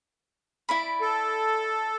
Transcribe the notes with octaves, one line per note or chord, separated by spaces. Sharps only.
E4 D5 B5
A4